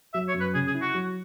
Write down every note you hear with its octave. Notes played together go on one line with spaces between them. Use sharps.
F#3 E5
C#5
F#2
B4
C#3 G#4
G#4
E4
F#4
F#3